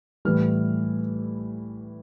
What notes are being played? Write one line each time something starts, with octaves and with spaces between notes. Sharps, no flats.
A2 E3 G3 F6